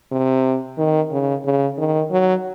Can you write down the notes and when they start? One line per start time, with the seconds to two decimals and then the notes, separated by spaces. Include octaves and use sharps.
0.11 C3
0.78 D#3
1.11 C#3
1.45 C#3
1.78 D#3
2.11 F#3